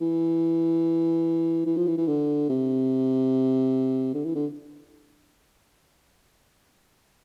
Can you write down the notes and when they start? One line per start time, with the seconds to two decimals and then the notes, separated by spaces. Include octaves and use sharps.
0.01 E3
1.66 E3
1.77 F3
1.87 E3
1.97 E3
2.08 D3
2.49 C3
4.14 D3
4.25 E3
4.35 D3